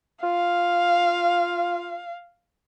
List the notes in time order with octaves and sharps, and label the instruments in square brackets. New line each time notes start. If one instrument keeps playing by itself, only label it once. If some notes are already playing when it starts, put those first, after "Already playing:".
[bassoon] F4 [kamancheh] F5